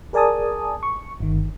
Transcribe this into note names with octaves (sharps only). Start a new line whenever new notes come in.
G#4 A#4 D5 G#5 A5 D#6
C#6
G1 D#3